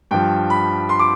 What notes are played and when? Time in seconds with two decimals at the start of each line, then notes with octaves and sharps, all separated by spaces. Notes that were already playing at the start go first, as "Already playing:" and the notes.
0.11 G2 F3 G5
0.50 B5
0.89 C6
0.99 D6